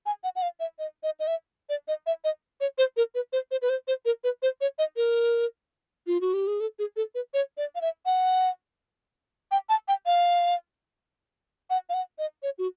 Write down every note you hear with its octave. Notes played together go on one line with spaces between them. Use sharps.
G#5
F#5
F#5
F5
E5
D#5
D#5
D#5
E5
D5
D#5
E5
D#5
C#5
C5
A#4
B4
C5
C5
B4
C5
C5
A#4
B4
C5
C#5
D#5
A#4
F4
F#4
G4
G#4
A4
G#4
A4
B4
C#5
D5
F5
E5
F#5
G5
A5
G5
F5
F#5
F5
F#5
D#5
C#5
F#4